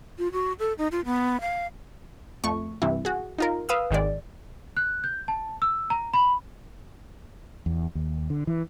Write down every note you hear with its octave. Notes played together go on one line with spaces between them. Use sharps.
F4
F#4
A4
D#4
F4
B3
F5
F2 A3 C#6
G2 C3 E3 E4
F#4 G#4
D#4 F4 A#4
B4 F5 D#6 E6
G#1 D#3 G#3 D5
F#6
G6
A5
E6
A#5
B5
E2
D#2
D3
E3